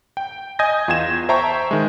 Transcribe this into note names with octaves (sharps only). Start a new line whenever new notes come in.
G5
D#5 G#5 D#6 G6 G#6 A#6
E2 F4 G5 G#6 E7
C5 E5 G5 A5 A#5 C#6
D#3 G#3